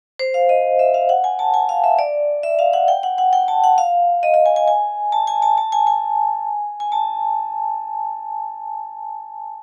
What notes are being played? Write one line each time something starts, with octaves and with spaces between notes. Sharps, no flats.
C5
F5
D#5
E5
F5
F#5
G#5
A5
G#5
F5
E5
D5
E5
F5
F#5
G5
F#5
F#5
G5
A5
F#5
F5
D#5
D#5
G#5
G#5
G#5
A5
G#5
A5
A5
G#5
G#5
G#5
A5